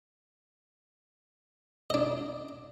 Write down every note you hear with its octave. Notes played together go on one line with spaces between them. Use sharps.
D4 D#5